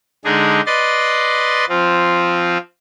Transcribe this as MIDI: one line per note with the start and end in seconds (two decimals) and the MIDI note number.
0.25 0.61 50
0.25 0.61 56
0.25 0.61 62
0.25 0.61 63
0.25 0.61 68
0.66 1.65 71
0.66 1.65 74
0.66 1.65 75
0.66 1.65 84
0.66 1.65 93
1.69 2.58 53
1.69 2.58 60
1.69 2.58 65